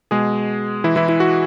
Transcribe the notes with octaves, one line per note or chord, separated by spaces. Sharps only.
B2 G#3 G#4
E3 E4
E3 E4
E4
F#4